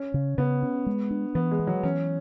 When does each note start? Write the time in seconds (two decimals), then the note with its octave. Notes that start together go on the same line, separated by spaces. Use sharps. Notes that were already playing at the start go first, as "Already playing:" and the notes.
Already playing: C#4
0.14 C#3
0.38 C#3 B3
0.63 C#4
0.86 G#3
1.11 D4
1.35 E3 B3
1.51 G#3
1.59 B3
1.67 F#3
1.83 E3 C#4